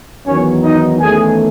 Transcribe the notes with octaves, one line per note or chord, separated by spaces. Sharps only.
E2 D#3 F#3 C#4 C#5
D#4 D#5
E2 D#3 A3 C#4 G#4 G#5